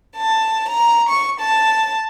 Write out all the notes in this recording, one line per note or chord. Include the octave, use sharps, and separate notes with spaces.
A5
A#5
C#6
A5